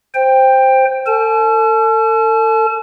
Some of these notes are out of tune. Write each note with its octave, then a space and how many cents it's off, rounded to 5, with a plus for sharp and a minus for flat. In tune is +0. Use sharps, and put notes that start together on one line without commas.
C5 +0 G5 +15
A4 +40 A5 -40